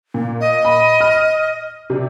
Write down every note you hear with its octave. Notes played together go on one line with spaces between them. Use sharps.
A#2
D#5
B5
F6
C3 D4